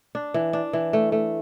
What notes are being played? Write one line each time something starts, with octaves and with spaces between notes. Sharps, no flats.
D4
E3
D4
E3
A3
A3